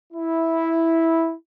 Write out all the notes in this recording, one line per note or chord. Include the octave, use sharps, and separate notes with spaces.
E4